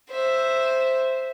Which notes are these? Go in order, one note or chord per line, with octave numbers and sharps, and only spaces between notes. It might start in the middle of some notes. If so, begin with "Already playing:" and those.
C5 E5